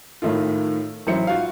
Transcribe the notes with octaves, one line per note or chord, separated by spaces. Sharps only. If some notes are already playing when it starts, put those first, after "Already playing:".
A2 D#3 A3 F4
A1 F#3 E4 C5 C#7
F4 F#4 F5